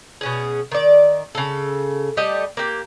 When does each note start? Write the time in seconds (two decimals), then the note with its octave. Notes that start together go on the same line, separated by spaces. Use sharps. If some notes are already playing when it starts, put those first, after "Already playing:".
0.21 B2 C#4 G#4
0.72 D#3 D5
1.35 C#3 A4
2.17 G3 A3 G4 D#5
2.57 A#3 G4